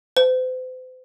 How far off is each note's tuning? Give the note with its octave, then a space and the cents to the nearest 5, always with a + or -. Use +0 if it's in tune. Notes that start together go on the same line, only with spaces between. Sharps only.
C5 -40